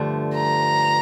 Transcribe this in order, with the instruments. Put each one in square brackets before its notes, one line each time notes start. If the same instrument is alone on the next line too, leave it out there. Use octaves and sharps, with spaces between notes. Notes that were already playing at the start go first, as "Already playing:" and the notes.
Already playing: [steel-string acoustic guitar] G2 D3 F3 A3
[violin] A#5